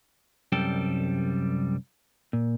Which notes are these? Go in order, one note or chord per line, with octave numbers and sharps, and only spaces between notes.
C2 F#2 G3 A4 G5
A#2